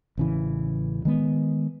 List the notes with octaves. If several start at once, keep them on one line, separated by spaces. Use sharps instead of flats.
A1 C#3 E3
D#3 G#3 B3